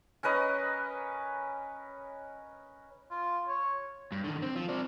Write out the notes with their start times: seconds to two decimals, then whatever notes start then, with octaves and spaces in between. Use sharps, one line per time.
0.23 C#4 A#4 B4 D#5
3.11 F4
3.49 C#5
4.12 G2
4.24 D3 D#3
4.42 C4
4.56 F3
4.69 C4 D5